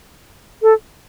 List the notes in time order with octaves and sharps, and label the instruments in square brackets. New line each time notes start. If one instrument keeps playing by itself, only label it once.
[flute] A4